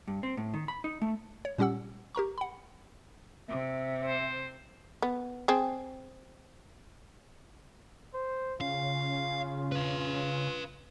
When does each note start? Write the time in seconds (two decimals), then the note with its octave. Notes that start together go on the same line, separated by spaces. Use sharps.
0.07 G2
0.23 C4
0.37 A2
0.54 D#3
0.68 B5
0.84 D#4
1.02 A3
1.45 C#5
1.58 A#2 G3 C#4 G4 F#5 E6
2.15 G4 A#4 A#5 C#6
2.38 F#5 B5
3.48 C3 E5
4.02 C5
5.02 B3
5.48 C4 G#4
8.14 C5
8.61 C#3 F4 F5
9.72 B4 F5